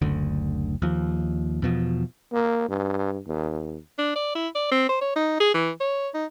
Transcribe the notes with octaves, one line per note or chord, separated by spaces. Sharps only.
F#1 D2 D3
D#2 F3
E2 B2 F3
A#3
G2
D#2
D4
D5
E4
D5
C4
C5
C#5
D#4
G#4
E3
C#5
D#4